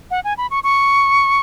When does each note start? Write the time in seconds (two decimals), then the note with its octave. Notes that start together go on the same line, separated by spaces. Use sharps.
0.11 F#5
0.24 G#5
0.37 B5
0.51 C#6
0.63 C#6